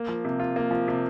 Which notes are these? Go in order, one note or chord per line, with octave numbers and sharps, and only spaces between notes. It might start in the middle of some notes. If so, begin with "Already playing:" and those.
Already playing: A#3
F3
C3
F4
A#3
F3
C3